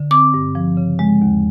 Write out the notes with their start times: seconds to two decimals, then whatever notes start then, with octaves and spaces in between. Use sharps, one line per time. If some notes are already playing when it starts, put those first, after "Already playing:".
Already playing: D3
0.11 C4 D6
0.34 G2
0.55 F3
0.77 C#3
0.99 G#3
1.22 D#2